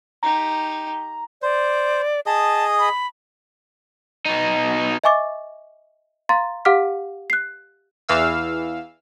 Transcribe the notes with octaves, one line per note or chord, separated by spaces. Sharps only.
D#4 G4 A#5
C5 D5
G#4 D#5 A5 D#6
B5
B2 D#4
D#5 E5 G#5 C#6 D6 A6
F5 A#5 C6 A6
G4 F5 F#5 D6 F6 B6
F#6 C7
E2 E3 F5 E6